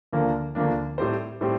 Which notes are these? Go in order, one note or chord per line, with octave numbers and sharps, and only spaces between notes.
D2 D3 F3 A#3 D4
D2 D3 F3 A#3 D4
A2 G3 C4 G4 C5
A2 G3 C4 G4